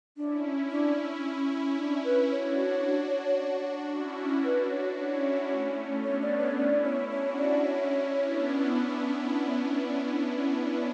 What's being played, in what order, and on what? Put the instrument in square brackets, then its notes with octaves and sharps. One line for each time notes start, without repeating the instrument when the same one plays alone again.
[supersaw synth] C#4 E4 [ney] D4
[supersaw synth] C#4 E4 [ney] D4
[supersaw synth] C#4 E4 [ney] D4
[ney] B4
[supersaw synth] D4 F#4 [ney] C#5
[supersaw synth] C#4 E4
[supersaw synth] D4 F#4 [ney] B4
[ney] C#5
[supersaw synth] C#4 E4 [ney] C#5
[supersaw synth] A3 C#4
[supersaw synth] B3 D4 [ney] C#5
[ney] D5
C#5
[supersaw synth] C#4 E4 [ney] D5
[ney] C#5
[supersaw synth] D4 F#4 [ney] C#5
[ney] D5
[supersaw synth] C#4 E4 [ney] C#5
[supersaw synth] B3 D4